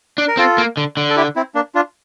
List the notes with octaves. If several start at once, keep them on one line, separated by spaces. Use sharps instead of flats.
D4
A#4
C4 F4 A4
A#3
D3
D3
A4
E4 G4
C4 E4
A#3 D4
D4 F4